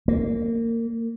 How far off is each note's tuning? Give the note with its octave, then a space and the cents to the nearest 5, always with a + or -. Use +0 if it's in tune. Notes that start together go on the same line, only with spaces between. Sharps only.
A#3 -25